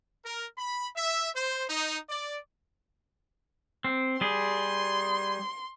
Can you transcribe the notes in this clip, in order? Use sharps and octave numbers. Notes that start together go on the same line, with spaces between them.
A#4
B5
E5
C5
D#4
D5
C4
G3 G#4 C6